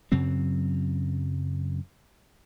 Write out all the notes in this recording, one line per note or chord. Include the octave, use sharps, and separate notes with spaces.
F#2 C#3 F#3 C4